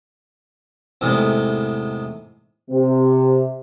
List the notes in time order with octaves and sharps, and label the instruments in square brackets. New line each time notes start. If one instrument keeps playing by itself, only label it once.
[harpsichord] E2 A2 C3 D#3 G#3
[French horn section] C3